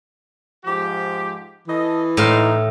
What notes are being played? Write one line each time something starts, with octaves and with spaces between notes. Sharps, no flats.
G#2 F3 G4
E3 A4 D#5
A2 D#4 F5 C6